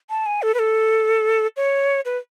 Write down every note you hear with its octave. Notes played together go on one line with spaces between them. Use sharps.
A5
G#5
A4
B4
A4
C#5
B4